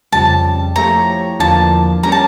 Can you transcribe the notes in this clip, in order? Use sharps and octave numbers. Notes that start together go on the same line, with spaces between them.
F2 C#3 G3 A5
F3 A3 E4 G4 C#5 A#5
E2 D3 F3 A#3 D4 A5
G3 C#4 G4 A#4 C#5 A#5
A5